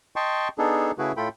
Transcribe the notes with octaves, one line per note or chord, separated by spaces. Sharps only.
D#5 G5 A5 C6 C#6
B3 D4 D#4 G#4 A4
C#3 A3 E4 F#4 G#4 B4
A2 A3 F4 A4 G5 B5